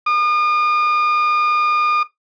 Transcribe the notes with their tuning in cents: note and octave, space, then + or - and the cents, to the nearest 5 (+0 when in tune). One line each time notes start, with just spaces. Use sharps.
D#6 -40